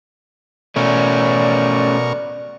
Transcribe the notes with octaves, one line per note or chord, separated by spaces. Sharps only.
B2 A3 C#4 A#4 D5 C#6